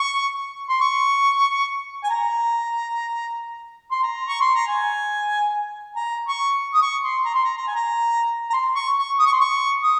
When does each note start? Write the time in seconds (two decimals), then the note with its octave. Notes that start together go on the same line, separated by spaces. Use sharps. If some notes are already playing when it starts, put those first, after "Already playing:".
Already playing: C#6
0.69 C6
0.81 C#6
2.04 G#5
2.10 A#5
3.91 C6
4.03 A#5
4.28 C#6
4.41 C6
4.54 A#5
4.67 G#5
5.96 A#5
6.28 C#6
6.74 D#6
6.82 C#6
7.04 C6
7.25 A#5
7.35 C6
7.44 A#5
7.58 A#5
7.67 G#5
7.76 A#5
8.50 A#5
8.54 C6
8.75 C#6
8.97 C#6
9.19 D#6
9.26 C#6
9.33 C6
9.41 C#6
9.83 D#6